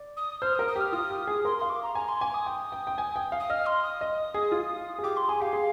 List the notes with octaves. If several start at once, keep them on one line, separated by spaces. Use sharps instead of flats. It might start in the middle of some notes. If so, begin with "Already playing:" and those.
Already playing: D5
D#6
C5 F6
D#6
A#4
D#6
G4 F6
F4 D#6
G4
G#4
A#4 C6
F5 C6
D6
A#5
G#5 A#5
C6
G#5 D6
D#6
G5
G5
G5
G#5
G5
F5
D#6
D#5 F6
C6
D#6
D#5
G#4
F4
G#4
G4 D6
C6
G#4 G#5
G4 F5
G#4